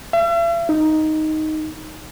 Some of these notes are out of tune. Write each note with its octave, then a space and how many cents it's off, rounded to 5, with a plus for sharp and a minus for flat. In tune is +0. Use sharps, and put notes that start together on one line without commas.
E5 +45
D#4 +0